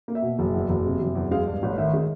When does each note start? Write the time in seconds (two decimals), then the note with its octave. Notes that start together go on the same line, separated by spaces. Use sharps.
0.08 A#3
0.15 E5
0.22 B2
0.39 F#1
0.54 E2
0.69 F#1
0.85 C3
1.01 F#1
1.15 E2
1.31 G#3 F5
1.47 G2
1.63 A1
1.78 D#3 E5
1.93 G#3